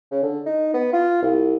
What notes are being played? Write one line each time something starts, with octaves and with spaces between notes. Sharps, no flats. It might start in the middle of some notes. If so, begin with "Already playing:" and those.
C#3
D3
D#4
B3
F4
C2